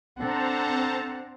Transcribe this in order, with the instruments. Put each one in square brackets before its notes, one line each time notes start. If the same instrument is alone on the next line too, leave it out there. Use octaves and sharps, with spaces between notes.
[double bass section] C4 [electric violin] D4 F#5 [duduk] A4 [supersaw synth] C5 A5 A#5